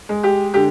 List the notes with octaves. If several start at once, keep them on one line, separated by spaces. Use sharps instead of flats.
G#3
G4
D3 G4